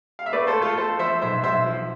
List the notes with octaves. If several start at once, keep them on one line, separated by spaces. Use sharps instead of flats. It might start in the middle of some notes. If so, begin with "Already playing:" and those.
F5
E5
A3 B4 D5
A4 C5
A3
F4 A4
A3 A4 C5
F3 C5 E5
B1 C5 E5
B1 C5 E5
F3